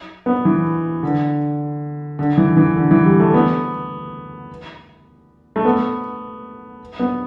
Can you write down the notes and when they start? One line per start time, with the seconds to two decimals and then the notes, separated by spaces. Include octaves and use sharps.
0.26 B3
0.45 E3
1.03 D3
2.19 D3
2.37 E3
2.57 E3
2.76 D3
2.91 E3
3.05 G3
3.20 A3
3.34 B3
5.56 A3
5.65 B3
6.99 B3